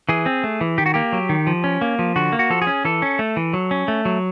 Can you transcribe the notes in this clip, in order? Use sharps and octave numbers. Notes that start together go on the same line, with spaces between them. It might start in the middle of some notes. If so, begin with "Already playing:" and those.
E3 G#4
C4
A3
E3
D#3 G4
F#4
A#3 G4
F#3
D#3
F3
C#4
A#3
F3
D3 F#4
A#3
F#4
F3 A4
G#4
C#4
E3 A4
C#4
A3
E3
F#3
C#4
A3
F#3